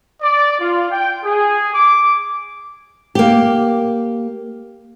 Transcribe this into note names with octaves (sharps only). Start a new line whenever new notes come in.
D5
F4
G5
G#4
D6
A#3 G4